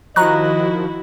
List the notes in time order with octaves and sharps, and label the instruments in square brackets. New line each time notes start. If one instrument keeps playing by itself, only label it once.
[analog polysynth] D#3 F3 [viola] E4 F#4 [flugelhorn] D#5 [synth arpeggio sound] A#5 C#6 F#6